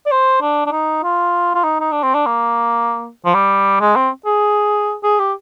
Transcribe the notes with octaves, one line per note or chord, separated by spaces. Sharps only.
D5
C5
D4
D4
D#4
F4
F4
D#4
D#4
D4
C4
D4
A#3
F3
G3
G#3
C4
G#4
G#4
G4